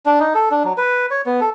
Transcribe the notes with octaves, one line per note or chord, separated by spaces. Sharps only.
D4
D#4
A4
D4
F#3
B4
C#5
B3
A4